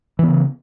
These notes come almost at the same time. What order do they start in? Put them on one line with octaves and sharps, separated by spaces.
E3 B3 C#3